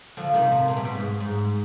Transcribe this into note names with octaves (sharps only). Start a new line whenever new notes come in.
D3 F3
C3 D#3
C3
B2
C3
B2
G#2
G#2